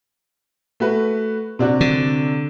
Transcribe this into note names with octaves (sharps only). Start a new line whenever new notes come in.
A3 F#4 B4
C3 D4 F#4
D3